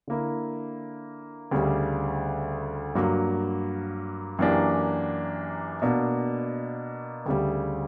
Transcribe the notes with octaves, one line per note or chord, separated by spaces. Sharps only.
D3 A#3 E4 A#4
D2 C#3 G3
G2 F#3 A#3
F#2 E3 A#3 D4 G4
B2 A#3 D4
D2 C#3 G3